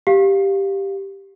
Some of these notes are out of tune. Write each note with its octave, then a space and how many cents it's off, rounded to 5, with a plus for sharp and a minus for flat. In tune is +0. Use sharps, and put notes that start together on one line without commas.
G4 +0 F5 +5